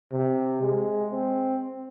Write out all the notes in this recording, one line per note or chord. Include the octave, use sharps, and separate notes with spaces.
C3
G#3
C4